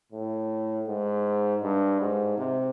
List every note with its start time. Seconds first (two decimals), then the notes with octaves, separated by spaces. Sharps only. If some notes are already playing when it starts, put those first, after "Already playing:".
0.12 A2
0.87 G#2
1.62 G2
2.00 G#2
2.37 C3